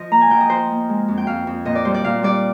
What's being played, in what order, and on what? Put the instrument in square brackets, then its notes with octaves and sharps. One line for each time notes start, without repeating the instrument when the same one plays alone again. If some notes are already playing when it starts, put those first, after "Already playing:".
Already playing: [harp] F3 D#5
A#3 A#5
G#5
F3 G5
D#5
F3 C5
A#3
G#3
F2
G5
F2 F5
F2
A#2 D#5
D5
G3 C5
D5
A#2 F5
G3 D5